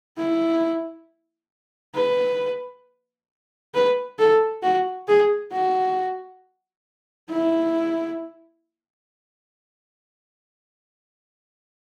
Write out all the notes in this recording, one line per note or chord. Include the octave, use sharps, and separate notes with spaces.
E4
B4
B4
A4
F#4
G#4
F#4
E4